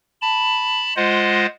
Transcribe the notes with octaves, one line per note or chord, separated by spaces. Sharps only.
A5 B5
G#3 F4 C5 D#5 F#5